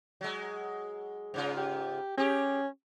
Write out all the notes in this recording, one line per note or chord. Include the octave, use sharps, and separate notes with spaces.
F#3 G#3
G#2 C#3 F4
G4
C#4 G4 G#4